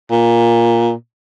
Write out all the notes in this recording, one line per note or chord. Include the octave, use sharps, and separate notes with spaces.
A#2